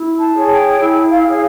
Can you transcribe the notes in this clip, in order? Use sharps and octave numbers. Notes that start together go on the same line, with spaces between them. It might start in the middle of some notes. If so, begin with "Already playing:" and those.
Already playing: E4
A5
G#4 C#5
G5
E4
F5
G#4 C#5